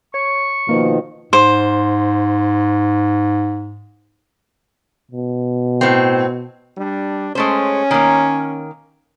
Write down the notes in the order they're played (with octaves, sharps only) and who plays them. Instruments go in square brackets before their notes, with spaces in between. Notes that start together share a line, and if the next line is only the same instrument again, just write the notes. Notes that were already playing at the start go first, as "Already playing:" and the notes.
[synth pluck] C#5 [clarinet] C#6
[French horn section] B2 D#3 F3 [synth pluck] A#3
[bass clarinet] G#2 [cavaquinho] C5
[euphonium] B2
[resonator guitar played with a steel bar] A2 C4
[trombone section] G3 D4
[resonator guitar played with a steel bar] G#3 A3 C5 [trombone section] C#4
[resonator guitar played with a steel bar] D#3 A#3